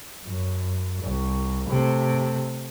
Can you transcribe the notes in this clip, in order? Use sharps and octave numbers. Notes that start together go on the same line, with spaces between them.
F#2
C2
C3 A3